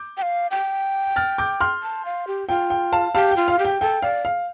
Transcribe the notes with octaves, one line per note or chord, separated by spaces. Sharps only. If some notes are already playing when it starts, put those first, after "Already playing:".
Already playing: D6 G6
G5
F5
G5
F6 A6
D6 G6
C6 F6
A5
F5
G4
F4 G5
G5
F5 A5
G4 F5 A5
G5
F4
F5
G4
G5
A4 G5
D5 F5
F5